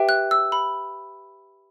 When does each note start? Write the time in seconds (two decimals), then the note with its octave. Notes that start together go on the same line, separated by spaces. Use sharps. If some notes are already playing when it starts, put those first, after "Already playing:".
Already playing: G4 B4 E5 G5
0.09 F#6
0.31 E6
0.52 B5